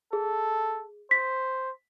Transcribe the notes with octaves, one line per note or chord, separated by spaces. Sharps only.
G#4 A4
C5 B6